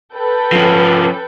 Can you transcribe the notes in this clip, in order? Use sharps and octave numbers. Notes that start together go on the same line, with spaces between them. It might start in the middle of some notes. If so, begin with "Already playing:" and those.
A4 B4 G5
F3 C#4